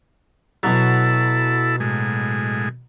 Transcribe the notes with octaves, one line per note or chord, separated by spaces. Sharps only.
B2 F#3 E4 A4
A2 G#3